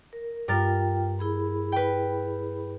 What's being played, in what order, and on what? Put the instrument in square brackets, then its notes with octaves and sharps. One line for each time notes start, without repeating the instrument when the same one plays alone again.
[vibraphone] A#4
[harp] G2 A#4 A6 [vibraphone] F4 G5
[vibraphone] E4 G#4 B5
[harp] B4 G5